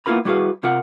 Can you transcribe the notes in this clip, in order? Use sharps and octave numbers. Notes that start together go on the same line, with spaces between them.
A#3 B3 E4 F4 A#4 B5
G3 E4 F#4 G#4 B4 F5
C3 F4 A#4 F#5